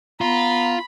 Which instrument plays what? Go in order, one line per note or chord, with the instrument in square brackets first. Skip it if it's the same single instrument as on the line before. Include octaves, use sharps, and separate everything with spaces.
[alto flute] B3 [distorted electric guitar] F4 [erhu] A#5 [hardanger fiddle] B5